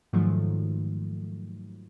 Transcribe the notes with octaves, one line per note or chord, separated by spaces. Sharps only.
G#2 D#3 F3 F#3 A3